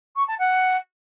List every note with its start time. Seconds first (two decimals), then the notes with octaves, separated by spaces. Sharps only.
0.16 C#6
0.27 A5
0.39 F#5